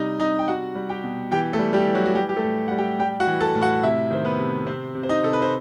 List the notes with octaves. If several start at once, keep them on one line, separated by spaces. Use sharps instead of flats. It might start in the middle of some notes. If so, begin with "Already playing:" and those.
Already playing: C3 G3 D#4 D#5
C3 D#4 D#5
G5
G3 F#4 F#5
G3
G4 G5
B2
E3 G4 G5
A3 A4
G3
G3 G4
E3
F#3 F#4
F#4
G3 G4
G4
A3 A4
A2
G3 F#5
G4 G5
G3 G4 G5
F#4 F#5
E3
A4 A5
A2
F#4 F#5
C3 E4 E5
D#3 C5
B3 B4
C3
C3 C4 C5
C3
C5
D#4 D#5
C3 A4
B4
C5